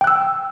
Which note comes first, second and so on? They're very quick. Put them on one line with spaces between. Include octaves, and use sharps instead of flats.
G5 F#6 E6